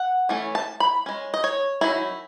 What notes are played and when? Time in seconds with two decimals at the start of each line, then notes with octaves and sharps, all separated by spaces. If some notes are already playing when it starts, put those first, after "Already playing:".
Already playing: F#5
0.29 E3 A3 C#4
0.55 A5
0.80 B5
1.06 G#3 C#4
1.34 D#5
1.44 C#5
1.81 D#3 F#3 C#4 E4